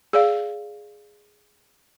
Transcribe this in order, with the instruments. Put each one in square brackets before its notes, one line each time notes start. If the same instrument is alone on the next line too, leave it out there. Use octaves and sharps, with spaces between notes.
[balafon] G#4 D5 F5